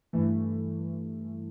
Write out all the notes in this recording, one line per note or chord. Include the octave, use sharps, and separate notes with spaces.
G2 E3 A3